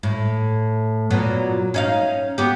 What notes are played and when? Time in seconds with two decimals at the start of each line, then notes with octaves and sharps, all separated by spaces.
0.03 A2
1.10 A#2 F#3 B3
1.74 C#4 D#4 F5
2.38 B3 G4